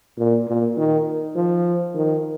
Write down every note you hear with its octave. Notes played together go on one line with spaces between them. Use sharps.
A#2
A#2
D#3
F3
D#3